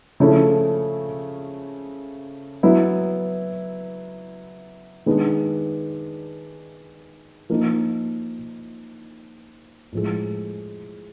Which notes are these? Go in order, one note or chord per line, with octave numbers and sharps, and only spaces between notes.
C#3 F3 A3 C#4 E4
F#3 B3 E4
D#3 G#3 B3 D4
F3 A#3 D#4
A2 F3 G#3